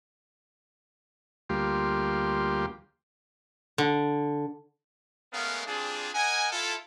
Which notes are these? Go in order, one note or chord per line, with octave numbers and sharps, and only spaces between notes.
D2 G3 A#3 F4 G4 C6
D3
G#3 A3 B3 C#4 A#4 F5
G3 C4 D4 F4 G#4
A#4 D#5 F#5 G#5
E4 F4 A4